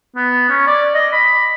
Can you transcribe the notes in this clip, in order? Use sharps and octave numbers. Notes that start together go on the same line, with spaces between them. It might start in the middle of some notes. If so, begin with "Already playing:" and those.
B3
C#4
D5
D#5
B5